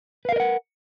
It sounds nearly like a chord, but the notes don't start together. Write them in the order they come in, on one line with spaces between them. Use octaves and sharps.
B4 F5 A#4 D#5 F#5